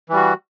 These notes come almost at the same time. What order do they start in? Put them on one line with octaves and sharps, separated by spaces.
E3 G3 F#4